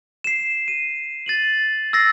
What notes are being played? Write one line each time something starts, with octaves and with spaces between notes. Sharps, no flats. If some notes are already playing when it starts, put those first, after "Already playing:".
C7 E7
D#7
A6 D#7 F#7
E6 A6 A#6 C7